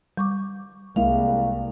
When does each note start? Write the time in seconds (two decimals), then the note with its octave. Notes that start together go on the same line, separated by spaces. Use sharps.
0.17 G3 C#6 D6
0.96 C2 G#3 A#3 E4 F5